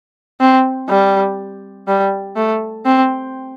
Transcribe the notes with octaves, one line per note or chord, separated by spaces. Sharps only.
C4
G3
G3
A3
C4